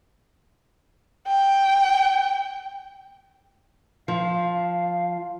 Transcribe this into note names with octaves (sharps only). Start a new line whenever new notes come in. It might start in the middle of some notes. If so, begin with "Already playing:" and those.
G5
F3 F5